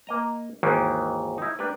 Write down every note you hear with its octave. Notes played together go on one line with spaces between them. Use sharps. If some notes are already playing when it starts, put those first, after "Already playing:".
A#3 D#5 A#5
G#1 D#2 D#3 E3
D#4 E4
D4 G4 A#4 B4